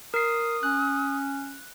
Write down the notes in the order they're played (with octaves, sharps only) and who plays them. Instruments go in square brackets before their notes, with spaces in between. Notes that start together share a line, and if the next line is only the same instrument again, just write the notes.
[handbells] A#4 C7 [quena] D#6
[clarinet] C#4 [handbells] F#6